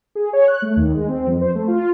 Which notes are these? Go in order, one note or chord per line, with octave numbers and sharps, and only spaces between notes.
G#4
C#5
F#6
A3
D#2
G#3
C4
F2
C5
A3
F4